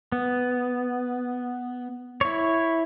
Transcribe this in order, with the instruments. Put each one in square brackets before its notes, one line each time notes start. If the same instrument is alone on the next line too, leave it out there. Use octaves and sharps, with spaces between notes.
[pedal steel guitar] B3
E4 C#5